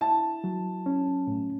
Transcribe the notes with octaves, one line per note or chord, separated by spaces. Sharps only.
E4 A5
F#3
C#4
A2